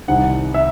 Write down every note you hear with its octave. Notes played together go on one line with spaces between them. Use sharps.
C2 C3 D#3 F#5
E5